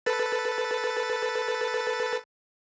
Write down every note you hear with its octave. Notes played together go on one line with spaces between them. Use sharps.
A4 B4 A6